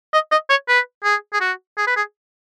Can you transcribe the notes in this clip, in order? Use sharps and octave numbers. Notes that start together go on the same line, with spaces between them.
D#5
D#5
C#5
B4
G#4
G#4
F#4
G#4
B4
G#4